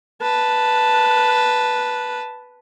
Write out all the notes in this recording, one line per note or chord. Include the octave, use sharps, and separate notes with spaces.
B4 A5